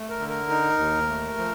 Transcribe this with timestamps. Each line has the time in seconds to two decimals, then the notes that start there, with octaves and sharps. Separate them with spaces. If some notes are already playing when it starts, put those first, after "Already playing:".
Already playing: A3
0.10 A#4
0.20 D3
0.29 A#4
0.50 D#4
0.78 D#2
1.08 A3
1.38 F3